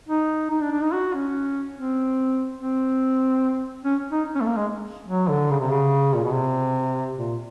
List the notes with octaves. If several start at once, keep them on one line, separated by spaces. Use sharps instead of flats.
D#4
D#4
D4
D4
D#4
F#4
C#4
C4
C4
C#4
D#4
C#4
A3
A#3
G#3
F#3
D3
C#3
C3
C#3
A#2
B2
C3
A#2